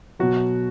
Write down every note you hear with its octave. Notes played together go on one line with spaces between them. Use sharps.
B2 F#3 F#4